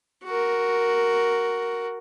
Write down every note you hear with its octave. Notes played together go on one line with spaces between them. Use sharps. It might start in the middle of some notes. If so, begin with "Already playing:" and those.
F#4 A#4